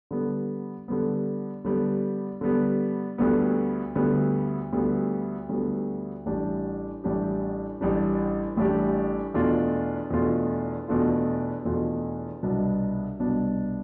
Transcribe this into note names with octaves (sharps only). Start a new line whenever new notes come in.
D3 G3 B3
D3 G3 B3
D3 G3 B3
D3 G3 B3
D2 D3 G3 B3
D2 D3 G3 B3
D2 D3 G3 B3
D2 D3 G3 B3
A1 A2 G3 D4 G4
A1 A2 G3 D4 G4
A1 A2 G3 D4 G4
A1 A2 G3 D4 G4
E2 B2 A3 D4 F4
E2 B2 A3 D4 F4
E2 B2 A3 D4 F4
E2 B2 A3 D4 F4
C2 B2 B3 D4
C2 B2 B3 D4